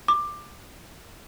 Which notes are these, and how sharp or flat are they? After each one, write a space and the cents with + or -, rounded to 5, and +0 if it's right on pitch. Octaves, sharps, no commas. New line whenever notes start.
D6 +15